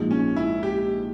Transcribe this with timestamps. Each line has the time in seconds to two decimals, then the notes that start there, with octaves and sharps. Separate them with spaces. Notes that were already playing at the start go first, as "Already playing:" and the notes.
Already playing: A#1 G#2 F3 G#3
0.11 C#4
0.36 E4
0.63 G4